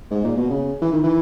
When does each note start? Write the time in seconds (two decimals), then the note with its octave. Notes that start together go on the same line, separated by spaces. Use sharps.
0.11 G#2
0.24 A#2
0.37 B2
0.50 C#3
0.82 E3
0.93 D#3
1.03 E3